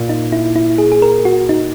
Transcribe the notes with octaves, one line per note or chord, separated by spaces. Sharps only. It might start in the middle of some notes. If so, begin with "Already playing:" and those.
Already playing: A#2
D#4
E4
E4
G#4
G#4
A#4
F#4
D#4